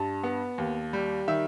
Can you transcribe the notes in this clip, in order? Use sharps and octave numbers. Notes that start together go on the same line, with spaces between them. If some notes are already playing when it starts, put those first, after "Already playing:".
Already playing: G2 A5
B3
D#2
G3
D#3 E5